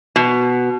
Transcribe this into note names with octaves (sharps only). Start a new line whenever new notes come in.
B2